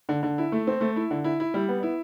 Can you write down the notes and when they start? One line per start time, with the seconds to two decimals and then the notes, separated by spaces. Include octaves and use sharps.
0.09 D3
0.23 D3
0.38 E4
0.52 A3
0.67 C4
0.81 A3
0.96 E4
1.11 D3
1.24 E4
1.40 E4
1.54 G3
1.69 B3
1.83 E4